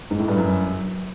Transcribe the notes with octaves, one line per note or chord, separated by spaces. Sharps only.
G#2
A2
G2
F#2